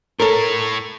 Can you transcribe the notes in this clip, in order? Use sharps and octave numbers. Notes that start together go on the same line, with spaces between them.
A2 A4 A#4 C#5